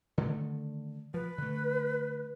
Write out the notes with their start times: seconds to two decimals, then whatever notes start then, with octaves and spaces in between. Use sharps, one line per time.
0.18 D3 D#3 A3
1.14 F3 B4
1.38 D3 A3